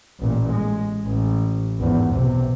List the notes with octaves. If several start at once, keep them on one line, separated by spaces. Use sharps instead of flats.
A1 A#2
G#3
A1
G#1 E2
B1 C3